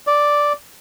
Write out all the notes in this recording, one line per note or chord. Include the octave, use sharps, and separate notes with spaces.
D5